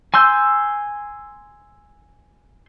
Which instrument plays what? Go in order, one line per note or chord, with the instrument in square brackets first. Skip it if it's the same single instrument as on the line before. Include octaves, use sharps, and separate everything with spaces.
[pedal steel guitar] G#5 C6 E6 G6